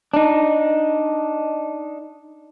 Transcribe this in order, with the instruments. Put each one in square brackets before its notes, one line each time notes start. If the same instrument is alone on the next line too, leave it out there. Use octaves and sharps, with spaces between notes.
[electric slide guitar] D4 D#4